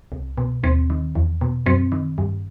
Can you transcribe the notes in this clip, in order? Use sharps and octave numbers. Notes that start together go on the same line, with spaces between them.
C2
B2
D#2 C4
D#3
E2
B2
F#2 C4
D#3
G2